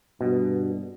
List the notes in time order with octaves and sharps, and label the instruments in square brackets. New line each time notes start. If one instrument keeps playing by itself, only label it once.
[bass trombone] G2 [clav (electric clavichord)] B2